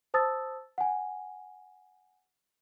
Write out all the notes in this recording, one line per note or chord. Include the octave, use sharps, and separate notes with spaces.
C5 A5 D#6 E6 A6
F#5 G#5